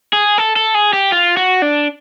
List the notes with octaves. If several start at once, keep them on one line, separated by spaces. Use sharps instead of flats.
G#4
A4
A4
G#4
G4
F4
F#4
D4